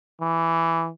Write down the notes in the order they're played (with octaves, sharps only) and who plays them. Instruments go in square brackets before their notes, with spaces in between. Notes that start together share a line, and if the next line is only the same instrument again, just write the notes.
[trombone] E3